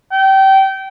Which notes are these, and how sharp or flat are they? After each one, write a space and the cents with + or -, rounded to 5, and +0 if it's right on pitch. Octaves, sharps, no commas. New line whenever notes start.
G5 -25